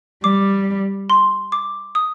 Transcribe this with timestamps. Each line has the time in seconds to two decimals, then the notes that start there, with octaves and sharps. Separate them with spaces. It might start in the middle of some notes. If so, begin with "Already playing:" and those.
0.24 G3 D6
1.10 C6
1.52 D6
1.95 D#6